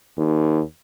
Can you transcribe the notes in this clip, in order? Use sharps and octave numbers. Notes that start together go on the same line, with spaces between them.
D#2